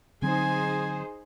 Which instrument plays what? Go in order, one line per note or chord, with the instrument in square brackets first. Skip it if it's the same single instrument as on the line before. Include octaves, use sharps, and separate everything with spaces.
[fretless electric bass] D3 F#3 C4 [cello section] D#4 G#4 C5 [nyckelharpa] G#5